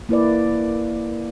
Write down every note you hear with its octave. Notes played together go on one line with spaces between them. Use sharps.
A#3 E4 B4 D5